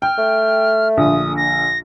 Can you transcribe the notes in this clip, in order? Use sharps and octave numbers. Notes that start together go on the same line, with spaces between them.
G5 F6
A3
A#1 A#2 D3 D#6
A#6